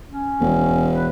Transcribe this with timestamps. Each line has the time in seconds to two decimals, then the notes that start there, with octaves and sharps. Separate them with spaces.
0.10 C#4
0.40 E1
0.93 B4